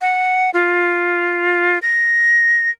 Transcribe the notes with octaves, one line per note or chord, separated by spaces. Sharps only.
F#5
F4
A#6